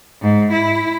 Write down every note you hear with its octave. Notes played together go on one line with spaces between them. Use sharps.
G#2
E4